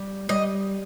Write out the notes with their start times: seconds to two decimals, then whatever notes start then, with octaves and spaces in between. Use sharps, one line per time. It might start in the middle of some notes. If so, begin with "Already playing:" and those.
Already playing: G3
0.29 G3 D#5